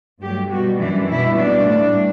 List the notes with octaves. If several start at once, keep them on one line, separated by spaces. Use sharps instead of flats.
G2 F#3 A3 G4
B2 G3 F#4
F#2 E3 G3 D4
B2 G3 E4
B2 G3 D4
A2 E3 G3